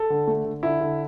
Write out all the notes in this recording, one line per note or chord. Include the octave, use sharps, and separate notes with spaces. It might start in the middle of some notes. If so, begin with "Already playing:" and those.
Already playing: A4
D3
A3
D3
D3 E4
D3